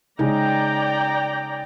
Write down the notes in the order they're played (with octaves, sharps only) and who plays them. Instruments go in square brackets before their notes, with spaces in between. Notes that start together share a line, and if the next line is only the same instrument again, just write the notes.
[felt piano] C#3 G#3 D#4 [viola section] D5 G5 A#5